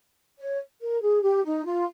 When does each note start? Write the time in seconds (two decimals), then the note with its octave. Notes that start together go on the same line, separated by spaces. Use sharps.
0.39 C#5
0.82 A#4
1.02 G#4
1.23 G4
1.45 D#4
1.65 F4